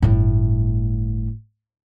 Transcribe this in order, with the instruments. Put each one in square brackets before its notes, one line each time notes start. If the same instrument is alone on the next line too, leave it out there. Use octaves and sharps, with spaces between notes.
[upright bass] G1 A2